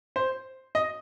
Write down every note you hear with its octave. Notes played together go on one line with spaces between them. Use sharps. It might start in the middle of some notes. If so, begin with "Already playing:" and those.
C5
D#5